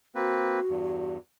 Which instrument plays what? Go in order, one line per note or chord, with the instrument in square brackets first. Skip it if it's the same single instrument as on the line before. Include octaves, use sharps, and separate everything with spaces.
[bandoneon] A#3 C4 B4 [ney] F#4
[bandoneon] E2 G2